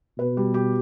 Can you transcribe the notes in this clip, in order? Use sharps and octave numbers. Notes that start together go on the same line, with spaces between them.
B2 B4
G3
G4